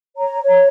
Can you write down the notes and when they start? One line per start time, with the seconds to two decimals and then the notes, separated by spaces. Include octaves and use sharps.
0.17 C#5 A#5
0.41 C#5
0.48 A#5